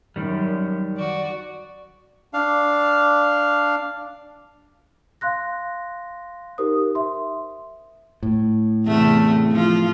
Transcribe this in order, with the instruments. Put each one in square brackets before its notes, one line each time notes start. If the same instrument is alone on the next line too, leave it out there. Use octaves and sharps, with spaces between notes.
[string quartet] F#2 [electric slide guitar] D#3 G3
[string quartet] F#4 D5
[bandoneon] D4 F5
[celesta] F5 C6 F#6 A#6
D#4 G4 A#4 C5 D#6
E5 C6
[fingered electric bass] A2
[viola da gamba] E2 C3 A3
F3 F4